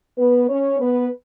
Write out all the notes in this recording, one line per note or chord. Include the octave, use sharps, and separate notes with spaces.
B3 B4
C#4 C#5
B3 B4